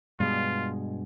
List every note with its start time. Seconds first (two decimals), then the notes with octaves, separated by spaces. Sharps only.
0.20 G2 B2 G#3 F4